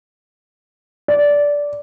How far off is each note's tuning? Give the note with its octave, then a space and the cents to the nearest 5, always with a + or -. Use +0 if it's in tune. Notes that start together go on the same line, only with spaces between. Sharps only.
D5 -15